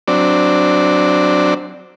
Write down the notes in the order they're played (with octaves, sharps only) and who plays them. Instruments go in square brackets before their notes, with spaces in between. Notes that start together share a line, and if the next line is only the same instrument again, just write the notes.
[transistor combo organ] F#3 C4 D4 D5